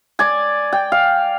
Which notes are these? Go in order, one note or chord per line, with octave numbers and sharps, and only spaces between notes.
D5 G#5
G5
F5